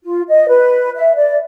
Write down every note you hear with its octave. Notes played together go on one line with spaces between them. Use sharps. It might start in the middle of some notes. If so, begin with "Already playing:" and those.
F4
D#5
B4
E5
D5